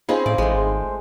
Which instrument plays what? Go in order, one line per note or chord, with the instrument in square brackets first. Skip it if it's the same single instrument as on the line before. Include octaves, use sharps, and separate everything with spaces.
[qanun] C4 C#4 F4 [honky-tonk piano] D#4 G#4 B5 [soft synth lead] C5
[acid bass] A2 [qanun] D5
[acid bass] A1 [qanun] G#3 A3
[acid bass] G#1